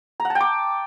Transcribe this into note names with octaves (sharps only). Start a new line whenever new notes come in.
A#5
F#5
A5
G5
D6